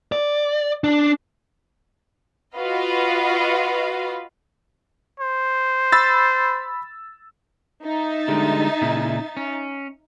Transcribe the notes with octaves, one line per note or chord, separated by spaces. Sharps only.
D5
D4
F4 F#4 B4 D#5 F5
C5
B5 E6 A6
D#4 E5 A6
D3 G3 G#3
A#2 C#3 E4
C#4